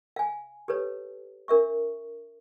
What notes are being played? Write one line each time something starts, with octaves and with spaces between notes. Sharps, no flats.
F5 G#5
G4 A4 B4 C#5
D4 A#4 E5 C#6